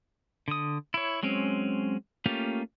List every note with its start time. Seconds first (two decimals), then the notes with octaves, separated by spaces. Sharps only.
0.48 D3 D#6
0.94 E4 C#5
1.23 F#3 G#3 C4 C#4
2.26 A3 A#3 C#4 F4 G4